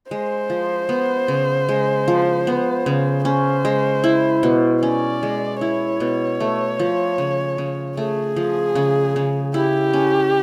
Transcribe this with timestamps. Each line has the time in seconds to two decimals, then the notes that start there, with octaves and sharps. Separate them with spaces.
0.11 G#3 C5
0.50 F3
0.89 B3
1.28 C#3
1.69 G#3
2.08 F3
2.47 B3
2.86 C#3
3.25 C#4 C5
3.65 G#3
4.04 E4
4.43 B2
4.83 C#4 D5
5.23 G#3
5.61 E4 C#5
6.00 B2
6.40 A3
6.79 F3
7.18 C#3
7.58 C#3
7.97 A3 G#4
8.36 F3
8.75 C#3
9.16 C#3
9.54 E4 G4
9.93 C#4